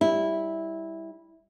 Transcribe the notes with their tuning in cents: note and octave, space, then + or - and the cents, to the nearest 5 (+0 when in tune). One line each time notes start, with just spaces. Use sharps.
G3 +10 E4 -10